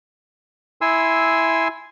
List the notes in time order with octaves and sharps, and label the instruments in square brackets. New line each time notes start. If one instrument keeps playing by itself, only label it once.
[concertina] E4 G#5 C6 E6